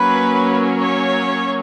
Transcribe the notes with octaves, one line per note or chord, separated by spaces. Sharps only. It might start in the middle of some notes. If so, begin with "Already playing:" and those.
Already playing: F#3 A#3 C#4 B4
C#5